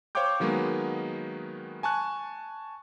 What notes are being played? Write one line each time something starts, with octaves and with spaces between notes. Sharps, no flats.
C5 C#5 F5 G5 D6 G6
D#3 F#3 G#3 A#3 B3
G#5 A5 C#6 F#6